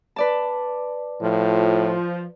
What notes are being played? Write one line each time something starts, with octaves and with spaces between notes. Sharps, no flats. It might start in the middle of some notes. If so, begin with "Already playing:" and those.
B4 D5 A5
A2 F3